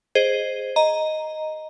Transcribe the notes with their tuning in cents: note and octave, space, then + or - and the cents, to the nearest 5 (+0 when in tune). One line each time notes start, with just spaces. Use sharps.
G#4 +0 C5 +0 D#5 -10
D#5 +0 A#5 +0